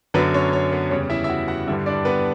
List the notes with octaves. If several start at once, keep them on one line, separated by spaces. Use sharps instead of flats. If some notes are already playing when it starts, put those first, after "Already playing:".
F#2 D3 F#3 B3 B4
C#4 C#5
C#4 C#5
B3 B4
E2 C#3 G3 C#4 C#5
E4 E5
E5
F#4 F#5
F#4 F#5
G2 D3 G3 E4 E5
D4 D5
B3 B4